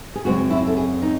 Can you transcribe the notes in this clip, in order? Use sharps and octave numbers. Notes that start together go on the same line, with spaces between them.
G#4
F#2 C#3 G#3 C4 F#4
E4
A4
G#4
D#4